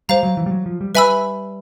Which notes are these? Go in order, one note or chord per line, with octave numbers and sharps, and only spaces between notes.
G3 C5 F5 A#5
F#3
E3
G3
F#3
F3
G3
G3 B4 E5 G#5 B5 E6